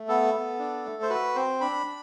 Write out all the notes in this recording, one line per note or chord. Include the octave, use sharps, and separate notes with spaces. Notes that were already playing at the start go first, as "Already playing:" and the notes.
Already playing: A3
B3 A4
B3
D4
A3
C5
F#4 B4
C4 C5
D4 B5
D4